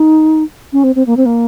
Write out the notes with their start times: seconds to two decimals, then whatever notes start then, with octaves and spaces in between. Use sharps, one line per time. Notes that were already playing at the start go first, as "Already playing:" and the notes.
Already playing: D#4
0.73 C#4
0.84 C4
0.95 C4
1.06 A#3
1.17 C4
1.26 A#3